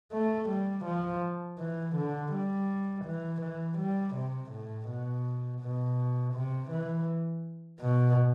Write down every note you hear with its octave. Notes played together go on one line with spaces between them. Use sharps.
A3
G3
F3
E3
D3
G3
E3
E3
G3
C3
A2
B2
B2
C3
E3
B2